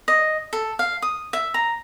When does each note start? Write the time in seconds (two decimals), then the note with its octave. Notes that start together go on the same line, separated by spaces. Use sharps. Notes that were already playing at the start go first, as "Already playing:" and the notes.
0.08 D#5
0.53 A4
0.79 F5
1.02 D#6
1.33 E5
1.54 A#5